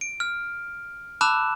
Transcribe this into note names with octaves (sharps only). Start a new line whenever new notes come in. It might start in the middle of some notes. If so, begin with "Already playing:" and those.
D7
F6
A5 B5 D6 E6 F#6 E7